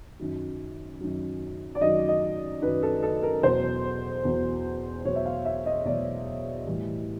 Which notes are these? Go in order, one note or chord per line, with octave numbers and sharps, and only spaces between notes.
F#2 D#3 F#3
F#2 D#3 F#3
D5
F#2 D#3 F#3 D#5
D#5
F#2 D#3 F#3 B4
A4
A4
A#4
E2 B2 F#3 C5
E2 B2 F#3
E2 B2 F#3 C#5
E5
F5
E5
D#5
E2 B2 F#3 D5
A2 E3 G3